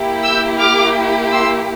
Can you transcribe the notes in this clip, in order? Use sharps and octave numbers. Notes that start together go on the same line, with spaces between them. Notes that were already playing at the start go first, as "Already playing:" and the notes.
Already playing: A#3 E4 G4
E6 G6
D6 F6
C6 E6